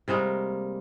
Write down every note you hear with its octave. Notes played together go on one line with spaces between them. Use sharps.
C3 G3 G#3 A#3